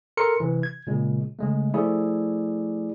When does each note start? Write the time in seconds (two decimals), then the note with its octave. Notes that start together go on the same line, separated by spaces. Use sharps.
0.17 A4 A#4 C6 C#7
0.40 C3 E3
0.63 G#6
0.87 A#2 C#3 G#3
1.39 C#3 G#3 A3
1.73 F3 A3 E4 G#4 D5